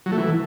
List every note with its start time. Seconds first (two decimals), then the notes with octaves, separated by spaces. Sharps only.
0.06 F#3
0.12 A3
0.18 E3